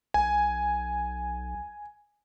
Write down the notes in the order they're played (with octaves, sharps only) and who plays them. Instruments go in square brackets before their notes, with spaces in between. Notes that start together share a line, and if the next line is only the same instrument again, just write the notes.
[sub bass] B1 [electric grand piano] G#5